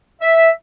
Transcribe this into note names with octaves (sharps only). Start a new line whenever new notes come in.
E5